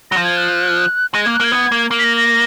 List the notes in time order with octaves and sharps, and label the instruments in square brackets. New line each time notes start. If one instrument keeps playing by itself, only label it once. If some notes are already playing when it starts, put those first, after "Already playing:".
[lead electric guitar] F#3 [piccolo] A#6
[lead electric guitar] F3
[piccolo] G#6
F#6
[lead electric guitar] G#3 [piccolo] A#6
[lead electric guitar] A#3 [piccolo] G#6
[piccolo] F#6
[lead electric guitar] A#3 [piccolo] G#6
[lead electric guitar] B3
A#3
A#3
[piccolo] B6
A#6
A#6